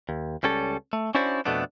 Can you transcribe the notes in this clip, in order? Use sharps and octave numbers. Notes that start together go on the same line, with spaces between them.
D#2
C#2 G3 C#4 A4
A3
C#4 D4 E4 F#4 C5 D5
F2 B2 A3 B3 D4